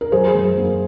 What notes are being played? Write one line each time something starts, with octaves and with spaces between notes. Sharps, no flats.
A#4
F#3 G#4 C5
F#2
A#3